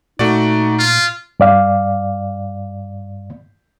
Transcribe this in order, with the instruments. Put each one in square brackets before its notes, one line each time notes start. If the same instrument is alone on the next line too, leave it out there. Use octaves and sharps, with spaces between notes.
[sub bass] A#2 [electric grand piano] A3 F#4 D5 [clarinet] D#4
[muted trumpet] F4
[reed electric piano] G2 D5 F5